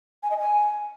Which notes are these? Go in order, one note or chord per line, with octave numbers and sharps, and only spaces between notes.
G#5
D#5
G#5